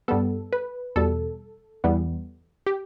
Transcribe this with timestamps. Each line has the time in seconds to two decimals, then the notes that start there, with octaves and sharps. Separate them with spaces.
0.08 G2 G3 B3 A4
0.53 B4
0.96 E2 B2 G3 A4
1.84 E2 E3 G3 B3
2.67 G4